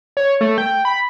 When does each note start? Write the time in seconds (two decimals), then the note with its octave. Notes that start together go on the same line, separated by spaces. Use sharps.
0.17 C#5
0.41 A3
0.58 G5
0.85 B5